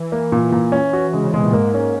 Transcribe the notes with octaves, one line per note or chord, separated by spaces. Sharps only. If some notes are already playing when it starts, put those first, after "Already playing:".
Already playing: E3
A#3
A#2
A#2
C#4
F#4
C#3 G#3
C3
B2 G#3
A#2
G#2 A#3
C#4